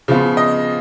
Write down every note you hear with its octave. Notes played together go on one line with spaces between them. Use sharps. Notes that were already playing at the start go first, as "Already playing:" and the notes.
C#3 F3 B3 F4
D#5